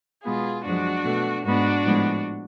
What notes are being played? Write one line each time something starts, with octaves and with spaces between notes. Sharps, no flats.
B2 G#3 B3 F4 G#4
F#2 F3 G#3 D4 F#4
B2 A3
G#2 G#3 B3 D4 F#4
A2 F3 G#3 B3